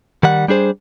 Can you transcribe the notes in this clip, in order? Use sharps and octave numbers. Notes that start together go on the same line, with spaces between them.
D#3 G3 F#5
G3 D4 G#4 C5